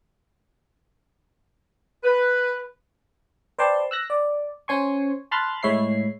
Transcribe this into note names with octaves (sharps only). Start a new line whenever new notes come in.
B4
B4 C5 D5 G5 A5 C6
E6 F#6 A#6
D5
C#4 C5 G#5 C6 C#6
A5 B5 C6 F6 F#6 A6
A2 G#3 C#5 E5 B5 C7